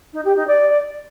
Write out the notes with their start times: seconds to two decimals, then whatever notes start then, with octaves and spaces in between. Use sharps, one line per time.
0.13 D#4
0.25 G4
0.36 D#4
0.47 D5